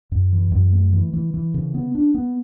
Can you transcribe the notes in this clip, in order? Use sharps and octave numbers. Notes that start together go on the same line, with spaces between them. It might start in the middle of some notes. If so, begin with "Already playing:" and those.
F#2
E3
F#2
A3
E3
E3
E3
C#3
B3
D4
B3